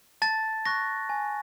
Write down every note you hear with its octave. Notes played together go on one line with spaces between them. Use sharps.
A5 A6
C#6 F#6 A#6
G#5